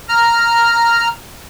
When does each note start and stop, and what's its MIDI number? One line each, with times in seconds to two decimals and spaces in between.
0.09 1.08 82
0.09 1.08 89